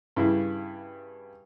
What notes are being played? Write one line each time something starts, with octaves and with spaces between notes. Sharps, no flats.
G2 C#3 E4